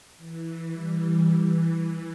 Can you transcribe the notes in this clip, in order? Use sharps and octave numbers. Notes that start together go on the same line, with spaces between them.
E3
G3
E3
E3